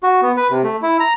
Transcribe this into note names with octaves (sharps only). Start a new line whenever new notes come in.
F#4
B3
B4
C3
A3
E4
A#5